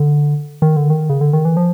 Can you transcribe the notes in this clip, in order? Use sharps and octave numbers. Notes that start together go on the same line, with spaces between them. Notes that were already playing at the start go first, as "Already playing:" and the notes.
Already playing: D3
D#3
D3
D#3
C#3
D3
D#3
E3
F3